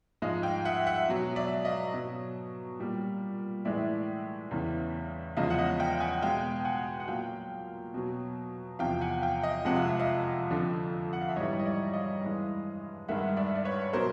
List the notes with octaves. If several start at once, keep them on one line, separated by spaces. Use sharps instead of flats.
G#2 F3 G#3 D#5 F5
F5 G5
E5 F#5
E5 F#5
B2 F#3
D5 E5
D#5 F5
B2 F#3
A#2 G3
A2 E3 G#3 D5 E5
E2 C#3 E3
E2 C#3 F3 G#3 D#5 F5
F#5
D#5 F5
F5 G5
F#5 G#5
B2 G#3 F5 G5
F#5 G#5
F#5
A#2 F#3 F5 G5
B2 F#3
E2 C3 F3 F5 G5
F#5 G#5
F5 G5
D#5 F5
F2 C3 F3 G#3 F#5
F5
E5
D#5 F5
F2 D3 F3
F#5
F5
E5
G#2 E3 G3 C#5 D#5
D#5
D5 E5
D#5 F5
G2 E3 G#3
G2 D#3 G#3 E5 F#5
D5 E5
D5
B4 C#5
B2 F#3 A#4 C5